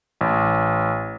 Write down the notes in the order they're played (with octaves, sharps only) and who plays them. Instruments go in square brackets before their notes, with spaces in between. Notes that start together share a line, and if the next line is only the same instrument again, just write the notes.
[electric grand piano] A1